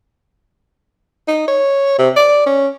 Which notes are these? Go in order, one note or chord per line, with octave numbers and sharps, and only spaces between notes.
D#4
C#5
C3
D5
C#4